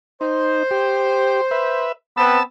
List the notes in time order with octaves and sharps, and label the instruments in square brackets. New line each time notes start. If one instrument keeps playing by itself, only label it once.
[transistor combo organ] D#4 [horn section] C5
[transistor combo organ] G4
B4 E5
[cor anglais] B3 [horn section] C4 B4 [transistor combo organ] A5 E6